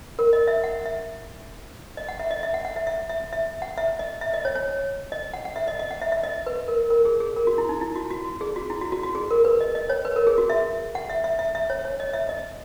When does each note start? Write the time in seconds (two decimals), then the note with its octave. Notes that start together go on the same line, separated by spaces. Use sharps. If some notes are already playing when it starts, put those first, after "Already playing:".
0.19 A#4
0.33 D#5
0.48 E5
0.64 F#5
0.86 E5
1.97 D#5
2.09 F#5
2.19 E5
2.31 D#5
2.43 E5
2.54 F#5
2.65 F#5
2.76 E5
2.87 E5
3.09 E5
3.33 E5
3.62 F#5
3.78 E5
3.99 D#5
4.21 E5
4.34 D#5
4.45 C#5
4.55 C#5
5.12 D#5
5.34 F#5
5.45 F#5
5.56 E5
5.68 D#5
5.79 D#5
5.91 F#5
6.01 E5
6.12 E5
6.23 D#5
6.46 B4
6.68 A#4
6.90 A#4
7.05 G#4
7.20 G#4
7.36 A#4
7.47 F#4
7.58 E4
7.69 D#4
7.81 E4
7.96 F#4
8.10 F#4
8.41 G#4
8.56 F#4
8.70 E4
8.81 F#4
8.92 F#4
9.03 F#4
9.15 G#4
9.31 A#4
9.45 B4
9.61 D#5
9.75 D#5
9.90 C#5
10.05 B4
10.16 A#4
10.27 G#4
10.38 F#4
10.50 E5
10.95 F#5
11.10 E5
11.24 E5
11.39 E5
11.55 E5
11.70 C#5
11.85 C#5
12.00 D#5
12.13 E5
12.29 D#5